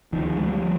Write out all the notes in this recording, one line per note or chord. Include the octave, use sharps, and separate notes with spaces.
D2 D#3 F3
G#3
D2 F3 G3